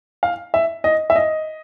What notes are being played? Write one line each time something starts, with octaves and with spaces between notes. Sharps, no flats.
F5
E5
D#5
E5
D#5